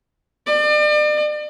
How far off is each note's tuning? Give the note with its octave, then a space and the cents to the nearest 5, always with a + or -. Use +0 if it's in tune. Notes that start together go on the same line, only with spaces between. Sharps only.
D5 +40